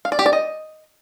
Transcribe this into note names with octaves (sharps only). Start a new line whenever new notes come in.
F5
D5
G4
D5
D#5